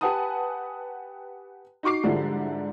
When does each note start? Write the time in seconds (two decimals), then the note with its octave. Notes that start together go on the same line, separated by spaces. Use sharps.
0.01 G4 B4 F#5 G#5 A5 D#6
1.83 D#4 F#4 C#6 D6 C7
2.04 G#2 D3 F3 G3 D4 E4